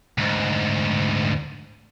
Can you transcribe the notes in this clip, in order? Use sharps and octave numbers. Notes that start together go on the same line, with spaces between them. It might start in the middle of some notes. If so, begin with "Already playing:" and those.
D2 G#2